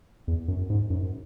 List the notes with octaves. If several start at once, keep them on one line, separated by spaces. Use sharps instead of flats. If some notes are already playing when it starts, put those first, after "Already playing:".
E2
F#2
G#2
F#2